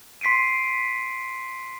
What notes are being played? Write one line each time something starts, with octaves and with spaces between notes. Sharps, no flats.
C6 B6 C7 D7 D#7